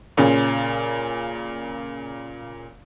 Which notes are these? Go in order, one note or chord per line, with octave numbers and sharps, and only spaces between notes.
A#2 C#3 C#4